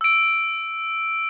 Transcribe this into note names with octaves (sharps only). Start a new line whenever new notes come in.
E6 D7